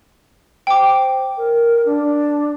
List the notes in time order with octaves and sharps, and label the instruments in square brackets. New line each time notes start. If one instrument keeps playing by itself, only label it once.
[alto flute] C5 [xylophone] G5 D6
[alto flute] A#4
D4